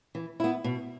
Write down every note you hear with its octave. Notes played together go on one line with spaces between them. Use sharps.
E3
B3 E4
B2